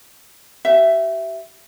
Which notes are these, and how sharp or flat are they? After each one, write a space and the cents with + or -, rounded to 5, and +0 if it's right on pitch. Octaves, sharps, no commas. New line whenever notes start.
G4 -35 E5 +10